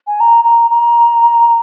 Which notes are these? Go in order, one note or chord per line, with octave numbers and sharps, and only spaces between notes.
G#5
A#5
A#5
A#5